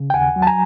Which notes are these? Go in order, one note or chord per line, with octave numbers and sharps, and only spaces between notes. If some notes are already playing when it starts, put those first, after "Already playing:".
Already playing: C#3
G5
D#2 F#5 G#5
F#3
A5
G#5 A#5